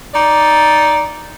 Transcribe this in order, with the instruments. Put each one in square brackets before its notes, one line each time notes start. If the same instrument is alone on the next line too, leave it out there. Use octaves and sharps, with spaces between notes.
[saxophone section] D#4 D5